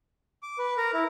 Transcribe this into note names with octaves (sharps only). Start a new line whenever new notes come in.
D6
B4
A#4
E4